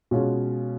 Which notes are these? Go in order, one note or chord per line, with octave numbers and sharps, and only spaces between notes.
B2 G#3 C#4 F4